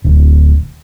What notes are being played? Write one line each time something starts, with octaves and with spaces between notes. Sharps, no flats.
D1